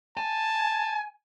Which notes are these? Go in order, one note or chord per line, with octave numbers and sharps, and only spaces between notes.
G#5 A5